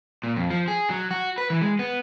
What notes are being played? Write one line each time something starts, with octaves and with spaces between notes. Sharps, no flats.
A#2
F2
F3
G#4
F#3
F#4
B4
E3
G#3
B3